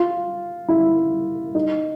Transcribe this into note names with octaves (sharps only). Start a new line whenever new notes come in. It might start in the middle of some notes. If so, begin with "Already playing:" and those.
Already playing: F4
E4
D#4